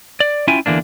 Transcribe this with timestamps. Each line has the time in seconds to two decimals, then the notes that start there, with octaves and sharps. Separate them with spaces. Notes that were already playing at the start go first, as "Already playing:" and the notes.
0.20 D5
0.48 C#4 E4 F4 E5 G5 G#5
0.66 E2 D3 E3 A#3 D4